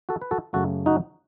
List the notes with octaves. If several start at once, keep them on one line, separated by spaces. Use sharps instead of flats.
F#4 A4
B4
F#4 A4
F#2 C#3 F#3 A3 F#4 A4
D#4 F#4